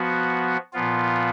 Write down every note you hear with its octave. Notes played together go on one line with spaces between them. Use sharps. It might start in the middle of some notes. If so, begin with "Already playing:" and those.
Already playing: F3 B3 F#4
A#2 F3 B3 F4